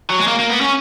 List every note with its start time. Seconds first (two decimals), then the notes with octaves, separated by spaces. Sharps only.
0.10 F#3
0.18 G#3
0.27 A#3
0.39 A#3
0.49 B3
0.61 C#4